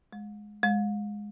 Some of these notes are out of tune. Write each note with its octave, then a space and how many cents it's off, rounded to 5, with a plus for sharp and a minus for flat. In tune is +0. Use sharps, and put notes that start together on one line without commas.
G#3 +10
G#3 +0